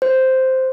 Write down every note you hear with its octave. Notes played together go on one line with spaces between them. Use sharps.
C5